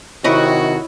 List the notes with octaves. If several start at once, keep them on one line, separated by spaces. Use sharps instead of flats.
C3 D#3 E4 F#4 C#5 D#5